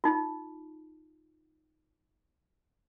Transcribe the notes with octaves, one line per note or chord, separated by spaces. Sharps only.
D#4 F4